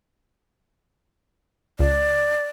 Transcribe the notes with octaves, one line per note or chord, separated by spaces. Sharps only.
C#2 D5